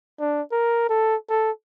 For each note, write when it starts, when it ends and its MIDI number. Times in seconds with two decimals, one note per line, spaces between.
0.20 0.42 62
0.52 0.87 70
0.89 1.16 69
1.29 1.51 69